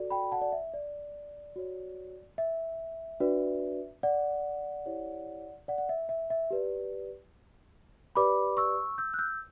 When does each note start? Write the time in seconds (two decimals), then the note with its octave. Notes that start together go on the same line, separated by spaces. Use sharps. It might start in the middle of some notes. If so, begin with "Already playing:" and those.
Already playing: F#4 A4 D5
0.10 G5 B5
0.32 F#5 A5
0.42 D5
0.52 E5
0.74 D5
1.56 F#4 C#5
2.38 E5
3.20 D4 F#4 B4 D5
4.03 D5 F#5
4.86 E4 G4 C#5
5.68 D5 F#5
5.78 F#5
5.89 E5
6.09 E5
6.30 E5
6.50 G4 B4 D5
8.15 G4 B4 D5 B5 D6
8.57 C#6 E6
8.98 E6 G6
9.14 F#6
9.19 E6 G6